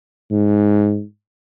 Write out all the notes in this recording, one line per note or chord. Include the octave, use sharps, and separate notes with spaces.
G#2